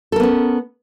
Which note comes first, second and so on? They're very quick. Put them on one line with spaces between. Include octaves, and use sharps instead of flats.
A4 A#4 B3 C#4